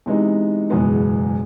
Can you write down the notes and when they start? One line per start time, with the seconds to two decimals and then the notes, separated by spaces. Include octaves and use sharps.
0.06 C3 E3 G#3 B3 D#4
0.70 F#1 E2 B2 G#3 B3